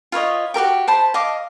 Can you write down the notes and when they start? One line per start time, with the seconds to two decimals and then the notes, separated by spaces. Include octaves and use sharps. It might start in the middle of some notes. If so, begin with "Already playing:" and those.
0.12 F4 B4 C#5 D#5
0.54 F#4 G4 A#4 G5
0.88 C5 A5 B5
1.14 D#5 F5 D6